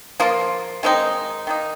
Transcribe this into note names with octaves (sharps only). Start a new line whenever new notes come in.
F3 A#3 F4
D#3 G#3 C4 D#4
D#3 A#3 D#4